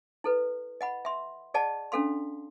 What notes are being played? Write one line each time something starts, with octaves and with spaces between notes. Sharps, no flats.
E4 A4 B4
D#5 F#5 B5
E5 C6
G#4 D5 D#5 F#5 A5
C#4 D4 A4 F5 C6